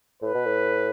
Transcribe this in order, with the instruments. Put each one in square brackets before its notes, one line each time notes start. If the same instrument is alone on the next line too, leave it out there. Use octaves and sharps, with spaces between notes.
[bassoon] A2 [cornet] B4
[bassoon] B2
A2